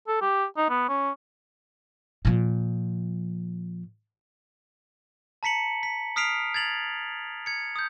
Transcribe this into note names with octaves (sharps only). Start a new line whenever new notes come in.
A4
G4
D#4
B3
C#4
A#2 F3
A5 A#5 B6 C#7 F#7
B6
D#6 F6 B6 C7 D7 F7
G#6 A6 F7 F#7
G#6 C#7
D#6 G6